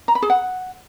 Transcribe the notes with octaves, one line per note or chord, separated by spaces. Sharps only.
A#5
B5
G#4
F#5